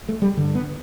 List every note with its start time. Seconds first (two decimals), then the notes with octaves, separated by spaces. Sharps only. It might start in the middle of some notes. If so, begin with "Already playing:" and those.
0.09 A3
0.22 G3
0.37 G2 D3
0.55 B3